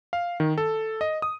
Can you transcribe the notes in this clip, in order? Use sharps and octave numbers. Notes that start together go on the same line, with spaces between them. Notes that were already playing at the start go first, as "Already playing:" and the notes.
F5
D#3
A4
D#5
D#6